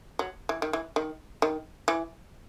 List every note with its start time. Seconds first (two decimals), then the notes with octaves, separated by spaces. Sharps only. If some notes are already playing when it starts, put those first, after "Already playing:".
0.19 F#3
0.49 E3
0.62 D#3
0.73 E3
0.96 D#3
1.42 D#3
1.88 E3